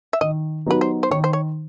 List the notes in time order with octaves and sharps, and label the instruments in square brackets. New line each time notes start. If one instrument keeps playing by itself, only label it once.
[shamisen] E5
[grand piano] D#3 [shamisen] D#5
[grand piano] F#3 B3 D#4 G4 [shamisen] B4
[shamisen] C5
C5
[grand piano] D#3 [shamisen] C#5
[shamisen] C5
C#5